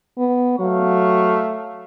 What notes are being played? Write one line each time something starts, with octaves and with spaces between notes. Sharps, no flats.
B3
F#3 A3 F5 C#6